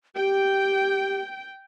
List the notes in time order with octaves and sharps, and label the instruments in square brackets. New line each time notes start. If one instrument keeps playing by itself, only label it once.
[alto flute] G4 [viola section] G5